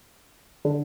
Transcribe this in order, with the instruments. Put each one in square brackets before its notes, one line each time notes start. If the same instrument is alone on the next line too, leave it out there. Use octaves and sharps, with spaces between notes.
[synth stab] D3